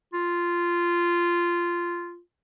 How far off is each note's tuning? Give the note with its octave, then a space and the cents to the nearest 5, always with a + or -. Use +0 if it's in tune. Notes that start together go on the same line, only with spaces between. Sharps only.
F4 -10